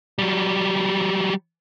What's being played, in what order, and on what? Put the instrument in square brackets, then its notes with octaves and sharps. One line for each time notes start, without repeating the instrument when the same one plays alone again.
[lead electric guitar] F#3 G3